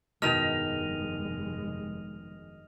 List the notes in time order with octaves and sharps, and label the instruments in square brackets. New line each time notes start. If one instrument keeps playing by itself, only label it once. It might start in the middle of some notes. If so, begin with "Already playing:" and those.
[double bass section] F1 G2 G#3 [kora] B2 D#3 [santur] D#5 [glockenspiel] F6 F7